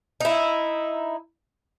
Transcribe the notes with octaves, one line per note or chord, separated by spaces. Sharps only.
D#4 E4